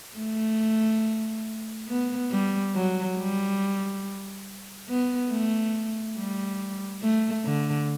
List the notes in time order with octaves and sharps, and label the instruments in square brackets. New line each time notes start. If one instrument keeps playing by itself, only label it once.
[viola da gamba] A3
B3
G3
F#3
G3
B3
A3
G3
A3
D3